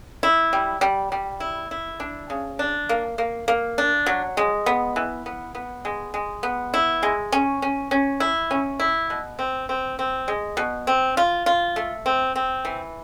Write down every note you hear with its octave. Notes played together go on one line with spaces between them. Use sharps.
E4
G3
G3
G3
E4
E4
D4
C#3
D4
A#3
A#3
A#3
D4
F#3
G#3
B3
E3
B3
B3
G#3
G#3
B3
E4
G#3
C#4
C#4
C#4
E4
C#4
E4
B2
C4
C4
C4
G#3
B2
C4
F4
F4
A3
C4
C4
E3